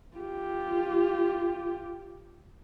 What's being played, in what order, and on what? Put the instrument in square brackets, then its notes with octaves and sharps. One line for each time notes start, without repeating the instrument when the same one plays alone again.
[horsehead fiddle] F4 G4